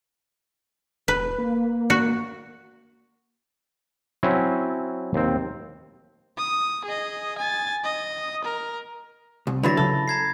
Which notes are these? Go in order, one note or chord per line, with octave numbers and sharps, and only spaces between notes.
E1 B4
A#3
F#4
F#3 C4 C#4 E4
D#2 C4
D#6
G#4 D#5
G#5 A6
D#5
A#4
C2
D3 E3 F#3 B5 A6 A#6
C#3 F#3 E4 A4
A#5 G#6 C7